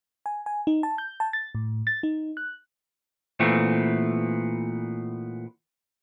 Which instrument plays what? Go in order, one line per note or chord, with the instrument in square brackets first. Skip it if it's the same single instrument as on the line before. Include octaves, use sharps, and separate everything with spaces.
[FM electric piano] G#5
G#5
D#4
A5
G6
A5
A6
A2
A6
D#4
F#6
[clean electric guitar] A#2 E3 A3 B3 C4